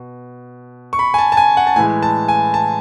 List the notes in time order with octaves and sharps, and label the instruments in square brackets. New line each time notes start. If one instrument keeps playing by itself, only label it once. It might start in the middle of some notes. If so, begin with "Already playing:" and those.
Already playing: [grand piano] B2
C#6
B5
G#5
A5
A5
G#5
F#5
A5
A2 E3 G#3 G#5
A5
G#5
A5